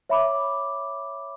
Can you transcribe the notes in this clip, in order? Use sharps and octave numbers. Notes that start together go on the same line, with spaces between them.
C#5 E5 B5 D6